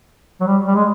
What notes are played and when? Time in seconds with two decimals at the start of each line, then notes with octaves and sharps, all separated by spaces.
0.41 F#3
0.47 G3
0.67 G3
0.75 G#3